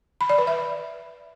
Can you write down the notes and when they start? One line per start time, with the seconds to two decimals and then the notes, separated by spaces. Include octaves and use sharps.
0.21 B5
0.29 D5
0.38 B4
0.47 E5